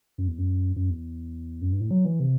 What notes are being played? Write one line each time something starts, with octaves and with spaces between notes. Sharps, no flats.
F#2
E2
F#2
F#2
E2
F#2
G2
A2
F#3
E3
C3